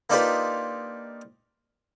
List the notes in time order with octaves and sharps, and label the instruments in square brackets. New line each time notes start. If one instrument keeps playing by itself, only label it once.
[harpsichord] A#3 D4 D#4 F4 G4 B4